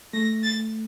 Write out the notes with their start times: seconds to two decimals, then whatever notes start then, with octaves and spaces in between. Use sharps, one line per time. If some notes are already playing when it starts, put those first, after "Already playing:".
0.13 A3 A#6
0.43 A6